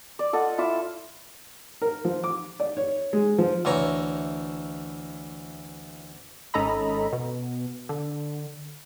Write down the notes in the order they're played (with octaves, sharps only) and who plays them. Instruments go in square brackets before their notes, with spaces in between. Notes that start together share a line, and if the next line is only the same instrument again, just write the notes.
[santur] D5
F4 A4 D#5 F#5
E4 F4 D6 E6
[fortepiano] A#4
F3
D6
D5
C#5
G#3
F3
[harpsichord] D2 E3 C#5 A#5
[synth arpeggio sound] G#1 C#4 A4 D#5 A#5 B5
B2
D3